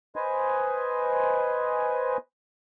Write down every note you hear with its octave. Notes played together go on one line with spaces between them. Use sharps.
B4 C5 D#5 G#5